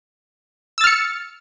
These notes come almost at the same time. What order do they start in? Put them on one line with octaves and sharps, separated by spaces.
E6 A6 F6 C#7